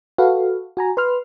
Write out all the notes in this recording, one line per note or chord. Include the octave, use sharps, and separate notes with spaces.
F#4 A4 B4 F5
F#4 G#5 A#5
B4 C6 F6